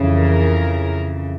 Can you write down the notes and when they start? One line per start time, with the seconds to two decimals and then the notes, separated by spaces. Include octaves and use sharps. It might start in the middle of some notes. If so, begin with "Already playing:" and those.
Already playing: F2 C#3 E3
0.17 A#4